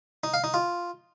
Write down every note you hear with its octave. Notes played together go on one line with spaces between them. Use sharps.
D#4
F5
D#4
F4